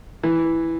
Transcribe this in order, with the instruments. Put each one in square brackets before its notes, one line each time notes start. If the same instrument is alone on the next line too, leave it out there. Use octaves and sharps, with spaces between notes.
[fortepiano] E3